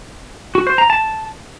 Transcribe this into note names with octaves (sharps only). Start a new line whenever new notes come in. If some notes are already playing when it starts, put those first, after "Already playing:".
F#4
C5
A#5
A5